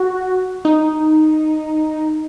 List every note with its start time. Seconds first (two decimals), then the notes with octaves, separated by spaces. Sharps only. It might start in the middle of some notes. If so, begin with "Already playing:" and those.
Already playing: F#4
0.65 D#4